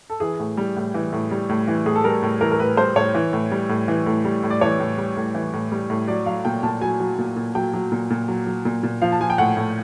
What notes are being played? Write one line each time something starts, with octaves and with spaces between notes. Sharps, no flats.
A4
E3 G#4
A2
G3
A2
E3
A2
G3
A2
E3
A2 G#4
A4
G3 A#4
A2
E3 A#4
A#4
A2 B4
G3 C5
A2 C#5
E3
A2
G3
A2
E3
A2
G3
A2
D5
E3 C#5
A2
G3
A2
E3
A2
G3
A2
F#3 D5
F#3 F5
A#2 G5
A#2 A5
F#3 G#5
F#3
A#2
A#2
F#3 G5
F#3
A#2
A#2
F#3
F#3
A#2
A#2
F3 F5
A5
F3 G#5
G5
A2 F#5
A2